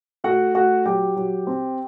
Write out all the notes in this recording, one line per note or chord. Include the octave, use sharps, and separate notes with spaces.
A3 F#4 F#5
A3 F#4 F#5
F#3 G4 G5
F#3
C4